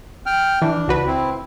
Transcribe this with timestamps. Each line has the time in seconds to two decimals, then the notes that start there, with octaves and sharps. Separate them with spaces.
0.26 G5 F6
0.62 E3 D4
0.88 C#2 F#4 B4
1.06 C4 E4